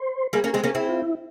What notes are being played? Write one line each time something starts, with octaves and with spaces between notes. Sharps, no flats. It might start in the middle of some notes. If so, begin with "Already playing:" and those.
Already playing: C5
G3 A#3 G#4
A#3 C#4
G#3 C4 G#4
A#3 C#4
C4 E4 G#4
F4
E4